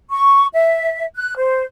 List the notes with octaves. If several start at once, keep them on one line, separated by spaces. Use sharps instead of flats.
C#6
E5
F#6
C5